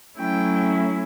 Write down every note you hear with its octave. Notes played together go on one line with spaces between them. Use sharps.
F#3 A3 C#4 E4 G5